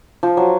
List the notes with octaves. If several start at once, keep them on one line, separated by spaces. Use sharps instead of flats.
F3
F#3